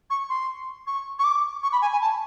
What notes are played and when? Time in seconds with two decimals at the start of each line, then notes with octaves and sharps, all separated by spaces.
0.10 C#6
0.29 C6
0.87 C#6
1.19 C#6
1.24 D6
1.63 C#6
1.72 B5
1.82 G#5
1.92 G#5
2.01 A5